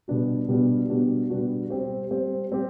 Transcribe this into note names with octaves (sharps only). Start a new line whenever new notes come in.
B2 G3 B3 D4 F#4
B2 G3 B3 D4 F#4
B2 G3 B3 D4 F#4
B2 G3 B3 D4 F#4
G3 C4 G4 C5
G3 C4 G4 C5
G3 C4 G4 C5